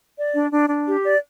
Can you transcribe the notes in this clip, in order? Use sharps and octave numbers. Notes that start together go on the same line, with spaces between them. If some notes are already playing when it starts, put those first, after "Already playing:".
D5
D4
D4
D4
G4
D5